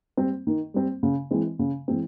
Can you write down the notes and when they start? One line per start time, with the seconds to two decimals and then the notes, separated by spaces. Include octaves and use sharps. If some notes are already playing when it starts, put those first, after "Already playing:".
0.17 G3 C4
0.47 D#3
0.74 G3 C4
1.03 C#3
1.31 E3 G#3 C4
1.59 C#3
1.88 E3 G#3 C4